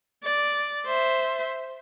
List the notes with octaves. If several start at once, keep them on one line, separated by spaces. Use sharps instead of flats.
D5
C5 E5